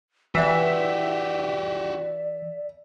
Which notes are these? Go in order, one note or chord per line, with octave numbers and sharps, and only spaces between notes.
E3 F#4 G4 D5 E5